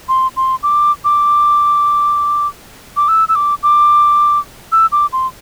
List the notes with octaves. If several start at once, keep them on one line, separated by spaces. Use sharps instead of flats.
C6
C6
D6
D6
D6
E6
E6
D6
D6
E6
D6
C6